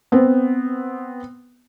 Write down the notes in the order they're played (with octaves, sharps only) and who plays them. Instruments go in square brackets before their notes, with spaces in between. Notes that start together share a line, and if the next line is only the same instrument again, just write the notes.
[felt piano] B3 C4